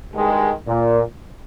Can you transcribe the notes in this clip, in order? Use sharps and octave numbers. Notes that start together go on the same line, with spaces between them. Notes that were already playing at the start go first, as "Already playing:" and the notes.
G2 D#3 G#3
A#2